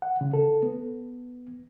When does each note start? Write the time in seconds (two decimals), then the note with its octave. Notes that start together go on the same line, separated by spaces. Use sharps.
0.02 F#5
0.21 C#3
0.33 A4
0.63 B3